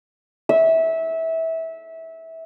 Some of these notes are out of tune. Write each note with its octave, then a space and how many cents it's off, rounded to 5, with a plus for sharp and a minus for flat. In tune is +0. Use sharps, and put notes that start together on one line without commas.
E5 -20